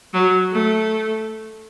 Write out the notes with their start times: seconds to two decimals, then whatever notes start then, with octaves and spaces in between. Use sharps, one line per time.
0.14 F#3
0.52 A3